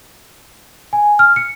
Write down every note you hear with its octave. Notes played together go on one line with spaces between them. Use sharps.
G#5
F6
C#7